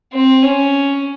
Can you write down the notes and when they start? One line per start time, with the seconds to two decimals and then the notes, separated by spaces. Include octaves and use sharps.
0.13 C4
0.43 C#4